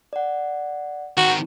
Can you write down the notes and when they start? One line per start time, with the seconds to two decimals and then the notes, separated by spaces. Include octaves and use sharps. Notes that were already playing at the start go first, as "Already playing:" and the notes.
0.13 D5 F#5
1.17 D#3 C4 F#4